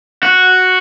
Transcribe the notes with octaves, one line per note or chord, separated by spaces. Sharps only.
F#4